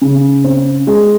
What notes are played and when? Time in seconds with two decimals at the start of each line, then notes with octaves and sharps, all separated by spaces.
0.01 C#3
0.44 C4
0.87 G#3